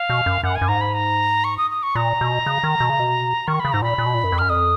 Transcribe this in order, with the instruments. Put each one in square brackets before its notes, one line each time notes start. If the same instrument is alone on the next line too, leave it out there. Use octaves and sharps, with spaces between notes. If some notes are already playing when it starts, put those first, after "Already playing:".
Already playing: [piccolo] F5
[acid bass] B2
F#2
[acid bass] F#2 [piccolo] F#5
[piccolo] G#5
[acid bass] F#2
[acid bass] G#2 [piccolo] A#5
[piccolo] B5
A#5
C#6
D#6
D#6
C#6
[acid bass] A#2 [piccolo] A#5
[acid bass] B2
C#3
D#3
B2
C#3
B2
[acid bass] D#3 [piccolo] C#6
[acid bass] C#3 [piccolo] B5
[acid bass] G#2 [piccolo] A#5
[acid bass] A#2 [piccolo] B5
[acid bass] A#2
B2
A#2
F#2
F2
[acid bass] F#2 [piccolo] F6
[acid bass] F2 [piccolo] D#6